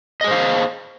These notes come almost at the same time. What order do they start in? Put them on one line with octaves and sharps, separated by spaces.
D#5 G#4 C5 F5